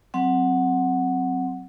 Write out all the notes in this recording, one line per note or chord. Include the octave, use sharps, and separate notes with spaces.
F#3 C4 F#5